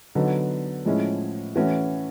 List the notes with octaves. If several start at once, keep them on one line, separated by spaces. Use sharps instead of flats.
D3 F#3 B3 D#4
A2 F3 G#3 C#4 E4
E3 A3 C#4 F#4